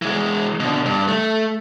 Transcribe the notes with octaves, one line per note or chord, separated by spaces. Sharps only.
E3 G#3
B2 D3
G2
A3